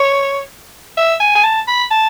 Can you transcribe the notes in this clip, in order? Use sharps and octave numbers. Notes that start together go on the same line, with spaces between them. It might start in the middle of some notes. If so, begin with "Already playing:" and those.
Already playing: C#5
E5
G#5
G#5
A5
B5
A5